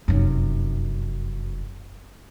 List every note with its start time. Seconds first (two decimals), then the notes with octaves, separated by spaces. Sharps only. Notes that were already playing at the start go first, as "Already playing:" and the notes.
0.08 F1 F#2